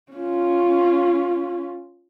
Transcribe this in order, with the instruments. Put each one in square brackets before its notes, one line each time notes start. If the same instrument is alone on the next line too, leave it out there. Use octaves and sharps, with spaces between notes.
[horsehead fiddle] C#4 F4